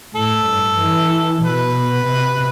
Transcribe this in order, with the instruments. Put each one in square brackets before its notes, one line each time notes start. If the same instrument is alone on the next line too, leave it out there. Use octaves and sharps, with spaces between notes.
[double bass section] A2 [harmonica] A4
[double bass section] G2
E3
[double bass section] B2 [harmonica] B4
[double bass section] C3